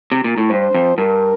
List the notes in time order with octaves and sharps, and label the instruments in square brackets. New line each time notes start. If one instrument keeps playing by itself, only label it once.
[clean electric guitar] C3
A#2
A2
[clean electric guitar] G2 [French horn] C5
[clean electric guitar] F2
[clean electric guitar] G2 [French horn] A#4